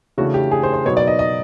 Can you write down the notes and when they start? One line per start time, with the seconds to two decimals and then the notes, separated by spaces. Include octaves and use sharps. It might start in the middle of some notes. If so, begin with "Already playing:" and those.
0.18 C#3 E3 A3 D4 F#4
0.34 G4
0.51 G#4
0.63 C5
0.74 C5
0.85 B2 F#3 B3 D#4 C#5
0.97 D5
1.07 D#5
1.19 D#5